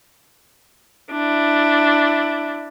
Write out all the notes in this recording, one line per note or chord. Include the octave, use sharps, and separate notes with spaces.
D4 E4